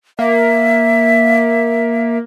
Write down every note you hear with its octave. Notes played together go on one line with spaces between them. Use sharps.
A#3 E5